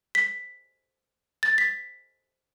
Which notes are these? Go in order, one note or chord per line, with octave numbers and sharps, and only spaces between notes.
B6
A6
B6